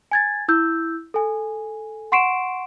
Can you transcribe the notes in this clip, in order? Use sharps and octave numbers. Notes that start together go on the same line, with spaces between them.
G#5 G#6 A6
E4 E6 G6
A4 G#5
F#5 C6 C#6 C7 D7 E7